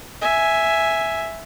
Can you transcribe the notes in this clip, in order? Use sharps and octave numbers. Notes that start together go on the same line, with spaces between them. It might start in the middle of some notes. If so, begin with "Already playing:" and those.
E5 G#5